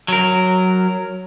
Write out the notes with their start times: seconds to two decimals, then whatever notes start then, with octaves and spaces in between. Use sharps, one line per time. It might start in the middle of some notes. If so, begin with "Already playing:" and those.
0.08 F#3 A#4